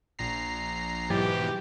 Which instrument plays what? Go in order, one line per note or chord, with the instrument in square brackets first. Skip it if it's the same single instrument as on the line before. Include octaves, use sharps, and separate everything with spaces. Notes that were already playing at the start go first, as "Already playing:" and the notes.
[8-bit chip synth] A#1 A#5 C7
[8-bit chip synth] G#2 B2 E3 [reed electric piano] F#3 A6 [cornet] G4